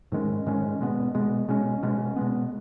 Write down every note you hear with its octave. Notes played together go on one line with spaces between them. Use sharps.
G#2 D#3 G#3 C#4
G#2 D#3 G#3 C#4
B2 G#3 B3
B2 G#3 B3
B2 G#3 C#4
B2 G#3 C#4
B2 G#3 B3